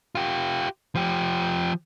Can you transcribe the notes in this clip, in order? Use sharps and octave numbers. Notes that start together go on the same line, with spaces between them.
F4 G4
F3 G4